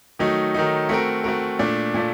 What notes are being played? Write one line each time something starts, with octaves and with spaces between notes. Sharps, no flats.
D#3 F#3 A3 D#4
D#3 F#3 A3 D#4
A3 C4 F#4 A#4
A3 C4 F#4 A#4
A#2 A3 D4
A#2 A3 D4